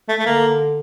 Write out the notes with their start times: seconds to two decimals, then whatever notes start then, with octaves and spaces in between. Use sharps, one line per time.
0.09 A3
0.19 A3
0.26 D3 A#3